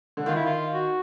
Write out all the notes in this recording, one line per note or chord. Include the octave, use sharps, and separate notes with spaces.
D3
D#3 F4
E4
F4
F#4